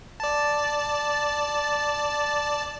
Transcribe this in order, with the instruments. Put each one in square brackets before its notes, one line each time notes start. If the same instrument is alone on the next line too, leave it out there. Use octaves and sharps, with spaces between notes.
[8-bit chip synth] D5 A5